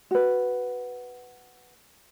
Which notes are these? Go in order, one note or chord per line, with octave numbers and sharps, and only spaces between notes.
F#4 B4